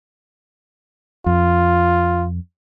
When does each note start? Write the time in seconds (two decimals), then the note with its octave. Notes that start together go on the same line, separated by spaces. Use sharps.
1.26 F2 F4